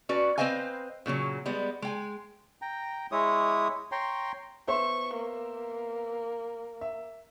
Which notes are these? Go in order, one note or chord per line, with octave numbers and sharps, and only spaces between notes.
C#4 F#4 B4 D5
C4 B4 C5 D#5 F5 G#5
A#2 C#3 E3 F#3
G3 G#3 B3
G#3 G5 G#5
G5 A#5
G#3 E4 C#5 D#6
C#5 G5 A#5 C6
B3 C5 E5 C#6
A#3
E5